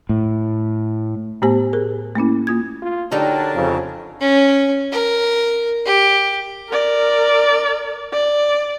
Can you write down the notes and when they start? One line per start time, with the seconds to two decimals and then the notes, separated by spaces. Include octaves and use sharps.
0.09 A2
1.42 A2 A3 B3 G4 C5 G#5
1.73 G#4 A#4
2.16 A3 A#3 C#4 E4
2.47 A#3 F4 G#6
2.82 F4
3.12 D3 F#3 D4 D#4 G4 A#4 A5
3.55 F2 C#3
4.21 C#4
4.92 A#4
5.86 G4
6.69 A#4 D5
8.13 D5